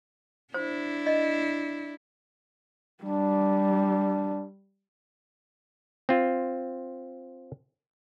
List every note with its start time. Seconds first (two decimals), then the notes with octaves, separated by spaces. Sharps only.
0.54 D4 E4 C5
1.06 D#5
3.04 G3 D4
6.09 C4 F4